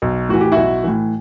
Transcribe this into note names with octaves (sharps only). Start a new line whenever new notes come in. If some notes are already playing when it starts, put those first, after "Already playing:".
B1
A2 E3 F#4
G4
B1 E4 F#4
A2 E3